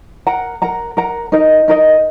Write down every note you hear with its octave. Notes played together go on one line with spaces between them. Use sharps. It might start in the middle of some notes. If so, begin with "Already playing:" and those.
A#4 F#5 A#5
A#4 F#5 A#5
A#4 F#5 A#5
D#4 A#4 D#5
D#4 A#4 D#5